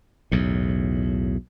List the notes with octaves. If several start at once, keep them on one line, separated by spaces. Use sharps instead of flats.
B1 E2 A2